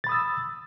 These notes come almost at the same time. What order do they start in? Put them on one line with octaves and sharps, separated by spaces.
A6 B5 D#6 E6